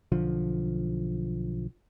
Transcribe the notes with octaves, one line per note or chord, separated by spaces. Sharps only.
B1 D3 F3